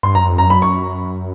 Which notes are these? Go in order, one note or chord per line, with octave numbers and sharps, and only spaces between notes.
G2 C6
F#2 A#5
F2
F#2 A#5
B5
C#6